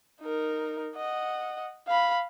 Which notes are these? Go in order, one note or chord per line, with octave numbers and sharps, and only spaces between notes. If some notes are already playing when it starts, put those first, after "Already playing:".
D#4 A#4
D#5 F#5
F5 B5